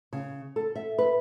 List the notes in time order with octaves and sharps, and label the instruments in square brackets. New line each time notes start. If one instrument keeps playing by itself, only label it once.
[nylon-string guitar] C#3
A4
E5
B4